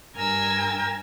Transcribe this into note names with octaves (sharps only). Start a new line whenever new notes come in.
G2 A#4 G#5 A#5 E6